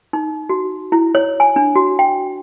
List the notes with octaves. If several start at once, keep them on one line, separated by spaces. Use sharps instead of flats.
D#4
F#4
E4
C#5
G#5
D4
F#4
G5